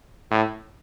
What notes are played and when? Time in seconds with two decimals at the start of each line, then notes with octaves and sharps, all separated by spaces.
0.31 A2